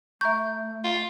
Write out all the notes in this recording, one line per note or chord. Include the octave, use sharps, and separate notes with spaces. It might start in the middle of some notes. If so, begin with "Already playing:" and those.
A3 E5 A#5 C#6 G6
F4